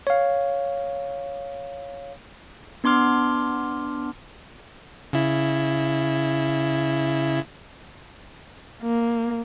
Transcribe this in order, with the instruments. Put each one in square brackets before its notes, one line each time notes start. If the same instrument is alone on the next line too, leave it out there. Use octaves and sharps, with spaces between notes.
[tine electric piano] C#5 F5
[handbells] B3 D4 C6 D6 F6
[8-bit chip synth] C#3 E4
[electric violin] A#3